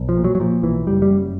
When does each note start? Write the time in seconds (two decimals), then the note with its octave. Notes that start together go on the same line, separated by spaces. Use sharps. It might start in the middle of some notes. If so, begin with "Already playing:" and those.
Already playing: B1
0.09 F3
0.17 A#2
0.24 F#3
0.35 F#3
0.40 A#2 F3
0.63 B1 E3
0.87 F#1 G3
1.02 G3
1.10 F#2